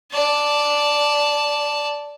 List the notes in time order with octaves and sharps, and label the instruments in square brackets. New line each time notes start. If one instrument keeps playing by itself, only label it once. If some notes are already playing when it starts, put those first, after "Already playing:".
[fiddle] D5 A5